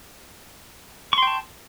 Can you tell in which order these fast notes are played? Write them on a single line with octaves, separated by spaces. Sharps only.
C#6 C6 G5 A5